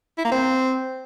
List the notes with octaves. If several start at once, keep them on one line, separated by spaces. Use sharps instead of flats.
E4
A#3
C4